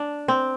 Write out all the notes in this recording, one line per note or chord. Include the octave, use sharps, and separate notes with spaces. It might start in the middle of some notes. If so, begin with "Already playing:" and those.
Already playing: D4
C4